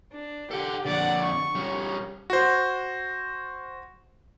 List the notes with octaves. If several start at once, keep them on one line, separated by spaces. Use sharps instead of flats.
D4
G4 A4 F#5
F2 D3 D5 F#5
C#6
G3 C#4
F#4 C5